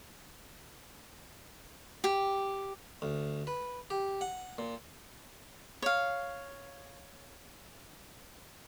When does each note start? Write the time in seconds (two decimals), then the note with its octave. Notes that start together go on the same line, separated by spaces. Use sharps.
2.04 G4
3.02 D2
3.47 B4
3.90 G4
4.21 F#5
4.58 A#2
5.82 C#5 F5